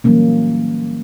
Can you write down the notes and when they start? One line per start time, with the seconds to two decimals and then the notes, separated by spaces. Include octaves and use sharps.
0.04 E3 F#3 G3 A#3 C#4